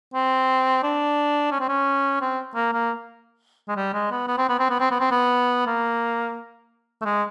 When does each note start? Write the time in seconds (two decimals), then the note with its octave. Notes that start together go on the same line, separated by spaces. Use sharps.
0.14 C4
0.83 D4
1.52 C#4
1.60 C4
1.69 C#4
2.21 C4
2.55 A#3
2.73 A#3
3.69 G#3
3.77 G3
3.94 G#3
4.12 B3
4.28 B3
4.38 C4
4.50 B3
4.60 C4
4.70 B3
4.80 C4
4.91 B3
5.01 C4
5.11 B3
5.67 A#3
7.01 A3
7.05 G#3